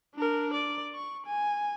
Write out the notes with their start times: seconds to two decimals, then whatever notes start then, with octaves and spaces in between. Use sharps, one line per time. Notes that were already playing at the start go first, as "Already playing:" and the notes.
0.15 D4 A#4
0.53 D5
0.95 C#6
1.26 G#5